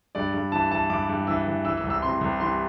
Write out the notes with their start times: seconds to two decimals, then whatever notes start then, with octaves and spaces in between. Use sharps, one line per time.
0.15 G2 D5
0.34 G2
0.52 E3 A5
0.71 E3 A5
0.90 G2 D6
1.09 G2
1.27 E3 E6
1.47 E3
1.65 E3 E6
1.77 E6
1.84 C2
1.90 E6
2.02 C3 C6
2.21 C2
2.40 E3 C6